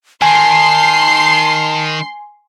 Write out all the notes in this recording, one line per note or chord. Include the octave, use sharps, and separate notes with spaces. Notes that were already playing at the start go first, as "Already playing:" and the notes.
D#3 G#5 A5 C6 C7